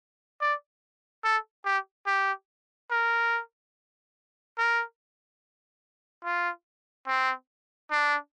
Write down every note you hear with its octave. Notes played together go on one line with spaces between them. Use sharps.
D5
A4
G4
G4
A#4
A#4
F4
C4
D4